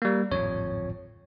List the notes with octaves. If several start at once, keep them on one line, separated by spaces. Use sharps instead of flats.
G3 A#3
D1 G#1 F2 C#5